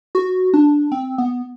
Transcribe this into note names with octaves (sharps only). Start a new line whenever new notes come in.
F#4
D4
C4
B3